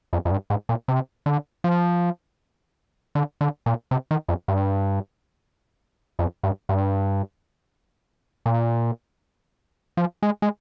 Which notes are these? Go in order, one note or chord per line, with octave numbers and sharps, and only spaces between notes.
F2
F2
G2
G#2
A#2
C3
D3
F3
D3
D3
A#2
C3
D#3
F2
G2
F2
G2
G2
A#2
F3
G#3
G#3